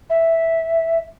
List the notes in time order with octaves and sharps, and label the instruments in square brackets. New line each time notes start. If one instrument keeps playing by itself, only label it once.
[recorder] E5